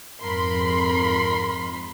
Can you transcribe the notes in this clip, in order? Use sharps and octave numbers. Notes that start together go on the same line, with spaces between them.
F2 G#2 A#4 B5 C6